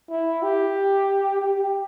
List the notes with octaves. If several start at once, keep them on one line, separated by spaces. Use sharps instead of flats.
E4
G4
G4